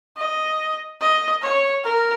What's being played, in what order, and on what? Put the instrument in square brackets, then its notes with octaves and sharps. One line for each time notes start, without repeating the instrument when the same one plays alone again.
[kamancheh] D#5
D#5
C#5
A#4